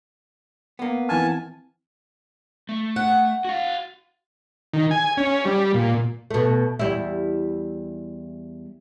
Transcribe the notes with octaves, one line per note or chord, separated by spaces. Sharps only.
A#3 B3
E3 C4 G#5 A5 F6
A3
F#5
F#4 F5
D#3
G#5
C#4
G3
A#2
B2 A3
E2 G3 E4